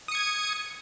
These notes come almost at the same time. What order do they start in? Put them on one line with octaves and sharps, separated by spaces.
D#6 C#7 G#6